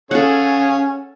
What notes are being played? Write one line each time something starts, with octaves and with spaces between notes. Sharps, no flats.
C#4 G#4 A4 C#5 F5 F#5